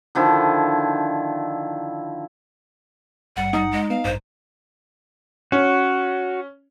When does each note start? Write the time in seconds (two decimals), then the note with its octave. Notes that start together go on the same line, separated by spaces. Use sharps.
0.15 D3 D#3 F3 E4
3.37 G#1 G2 G3 F#5
3.53 G3 D#4
3.72 G#3
3.90 B3 F5
4.05 A1 G2 C5
5.52 C#4 F#4